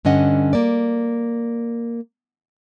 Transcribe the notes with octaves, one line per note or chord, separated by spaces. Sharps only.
G2 D3 C#4 D#5 F#5
A#3 D5